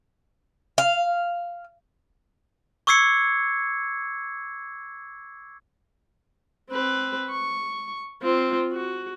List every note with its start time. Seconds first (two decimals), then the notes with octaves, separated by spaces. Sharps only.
0.78 F5
2.87 C#6 D6 E6 G#6 C7 C#7
6.70 C4 B4
7.30 C#6
8.22 C4 F4
8.72 F#4